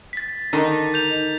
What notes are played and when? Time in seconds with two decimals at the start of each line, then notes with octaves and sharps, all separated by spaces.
0.13 A6 B6
0.53 D3 D#3 D4 D#4
0.94 G6 F7